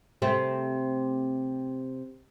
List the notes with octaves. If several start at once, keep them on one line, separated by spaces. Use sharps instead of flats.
C3 A3 C4